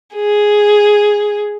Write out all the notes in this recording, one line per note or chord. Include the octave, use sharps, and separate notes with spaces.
G#4